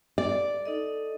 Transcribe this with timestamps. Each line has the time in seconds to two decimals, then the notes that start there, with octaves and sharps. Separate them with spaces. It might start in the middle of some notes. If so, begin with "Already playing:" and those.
0.18 D5
0.65 D#4 A4 D#5